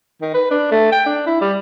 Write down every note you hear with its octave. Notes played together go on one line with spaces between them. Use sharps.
D#3
B4
D4
A3
G5
D4
E4
G3